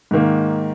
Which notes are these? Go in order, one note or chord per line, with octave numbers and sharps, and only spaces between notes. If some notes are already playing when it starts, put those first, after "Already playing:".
G#2 D#3 A#3